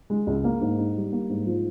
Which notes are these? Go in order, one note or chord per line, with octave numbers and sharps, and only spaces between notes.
G#3
C#2
A#3
G#2
D#4
G3
A#3
G#2
F3